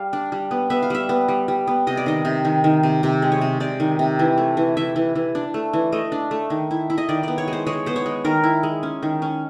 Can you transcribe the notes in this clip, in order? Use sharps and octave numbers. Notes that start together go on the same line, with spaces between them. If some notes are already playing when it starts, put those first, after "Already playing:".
Already playing: G3 F5
D4
G3
B3
B3 E5
F5
G3 E5
B3
G3
G3
B3
C3 D#5
D5
D#3 D#5
C3
D#3
D#3
C3
C3
G#3
C#5
C3
C3 D5
D#3
C3
E3
A3
E3
E3 E5
E3
E3
D4
A3
E3
A3 D#5
D4
A3
D#3
E4
E4
D#5
D#3 D5
B3 D5
C#5
G#3
C5
G#3 C#5
B3 C5
C#5
G#3
D#3 A#4
E4
G#3
C#4
D#3
C#4